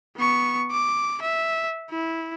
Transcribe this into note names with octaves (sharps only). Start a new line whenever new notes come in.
B3 C#6
D6
E5
E4